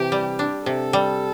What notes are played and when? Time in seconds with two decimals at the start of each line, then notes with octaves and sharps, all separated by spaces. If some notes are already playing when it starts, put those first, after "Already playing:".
Already playing: C3 E3 G4
0.12 G3
0.39 D4
0.66 C3 A4
0.93 G3